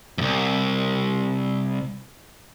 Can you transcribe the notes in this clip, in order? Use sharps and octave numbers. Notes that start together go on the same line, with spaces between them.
C2 F2